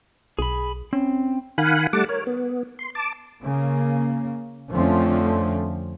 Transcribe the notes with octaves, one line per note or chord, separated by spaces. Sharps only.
B1 G#4 B5
C4 C#4
D#3 F5 F#5 G#5 B5
G3 A3 F#5 A5 D6
A#4 C#5
B3
C6
A5 D6
C#3 A#3
F2 D3 F3 A3 C4 C#4